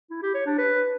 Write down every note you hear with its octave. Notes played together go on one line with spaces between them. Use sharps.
E4
G4
C#5
D4
B4